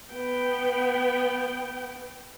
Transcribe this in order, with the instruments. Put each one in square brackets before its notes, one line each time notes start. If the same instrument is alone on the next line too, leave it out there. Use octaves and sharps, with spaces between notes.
[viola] B3 G5